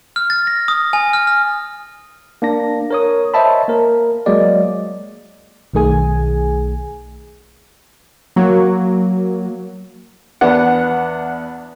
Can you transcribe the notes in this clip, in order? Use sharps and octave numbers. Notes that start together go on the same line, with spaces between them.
F6
A6
A#6
D#6
G#5
F6
F6
A#3 D4 A#6
A#4 C#5 D#6
C5 C#5 D#5 E5 A5 B5
A#3 A#4
F#3 G#3 A#3 D5 D#5
B1 D#3 A3 G#4 G#5
F#3 A#3
E2 B3 D4 F#5